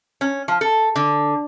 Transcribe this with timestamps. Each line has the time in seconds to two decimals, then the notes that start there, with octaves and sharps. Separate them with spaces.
0.21 C#4
0.48 F3
0.61 A4
0.96 D3